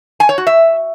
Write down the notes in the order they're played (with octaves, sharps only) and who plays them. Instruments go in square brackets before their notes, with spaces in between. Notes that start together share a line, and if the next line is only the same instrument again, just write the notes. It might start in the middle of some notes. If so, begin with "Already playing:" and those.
[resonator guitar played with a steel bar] G#5
C#5
F#4
E5